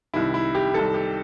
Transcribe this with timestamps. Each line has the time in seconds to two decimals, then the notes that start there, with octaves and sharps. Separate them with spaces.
0.14 C2 C3 D#3 E4
0.34 E4
0.55 G4
0.74 C2 C3 D#3 A4
0.94 G4